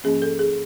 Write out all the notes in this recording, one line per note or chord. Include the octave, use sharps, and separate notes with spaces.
G#2 F3 A#3 C#4 G#4
A4
G#4